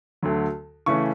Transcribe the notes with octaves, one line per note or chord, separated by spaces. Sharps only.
D2 D3 F#3
C#3 E3 A3 C#4 C#6